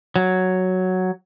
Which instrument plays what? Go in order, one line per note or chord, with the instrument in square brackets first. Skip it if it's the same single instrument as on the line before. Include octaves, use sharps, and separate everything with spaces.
[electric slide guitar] F#3